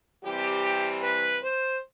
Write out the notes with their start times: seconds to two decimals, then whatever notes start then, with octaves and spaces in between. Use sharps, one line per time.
0.24 C3 E3 G3 C4 G4
1.01 B4
1.41 C5